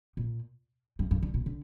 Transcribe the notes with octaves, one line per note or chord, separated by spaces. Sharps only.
A#2
G2
G2
D3
A#2
D3